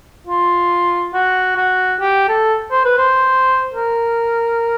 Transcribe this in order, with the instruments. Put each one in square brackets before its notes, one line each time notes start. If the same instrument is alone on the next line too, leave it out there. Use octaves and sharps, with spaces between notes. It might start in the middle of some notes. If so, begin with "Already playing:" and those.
[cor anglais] F4
F#4
F#4
G4
A4
C5
B4
C5
A#4